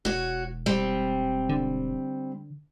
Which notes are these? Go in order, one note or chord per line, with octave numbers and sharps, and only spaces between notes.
E1 F#4 C#5
G3 C4
D3